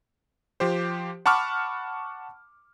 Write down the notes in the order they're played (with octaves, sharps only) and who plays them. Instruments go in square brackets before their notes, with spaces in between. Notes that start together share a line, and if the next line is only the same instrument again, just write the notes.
[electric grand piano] F3 G4 C5
F#5 A5 B5 C#6 D6 F6